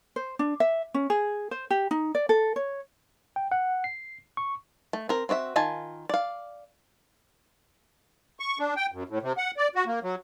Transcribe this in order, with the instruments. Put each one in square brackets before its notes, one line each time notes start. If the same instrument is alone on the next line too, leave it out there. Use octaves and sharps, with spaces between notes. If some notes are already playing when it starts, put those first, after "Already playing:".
[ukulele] C5
D4
E5
C#4
G#4
C5
G4
D#4
D5
A4
C#5
[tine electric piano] G5
F#5
C7
C#6
[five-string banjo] A3
C4 A#4
C4 F#4 D5 E5
D#3 F4 G#5 A5
D5 F5
[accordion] C#6
D4
G5
F#2
A2
C3
F#5
D5
F#4
A#3
F#3